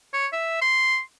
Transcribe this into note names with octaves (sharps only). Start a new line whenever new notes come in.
C#5
E5
C6